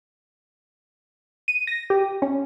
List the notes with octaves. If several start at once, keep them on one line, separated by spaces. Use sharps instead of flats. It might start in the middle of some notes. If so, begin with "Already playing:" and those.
D#7
A#6
G4
C#4